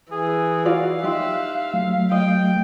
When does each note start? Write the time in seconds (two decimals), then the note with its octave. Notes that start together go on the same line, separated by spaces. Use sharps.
0.12 E3 G#4
0.65 F4 F#4 D5 F5
1.03 D#4 G4 C5 E5 F#6
1.74 F#3 A3
2.11 D#5 G5